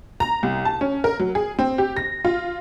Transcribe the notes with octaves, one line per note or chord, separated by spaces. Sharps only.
A#5
C2
A5
C#4
A#4
F#3
G#4
C4
G4
A#6
F4